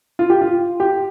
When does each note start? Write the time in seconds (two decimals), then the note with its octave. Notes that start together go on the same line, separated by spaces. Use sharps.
0.19 F4
0.30 G4
0.41 F4
0.80 G4